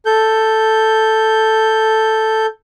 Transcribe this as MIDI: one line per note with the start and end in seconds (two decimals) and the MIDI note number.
0.06 2.46 69
0.06 2.46 91